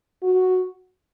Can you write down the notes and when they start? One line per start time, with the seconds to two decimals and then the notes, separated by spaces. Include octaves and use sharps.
0.23 F#4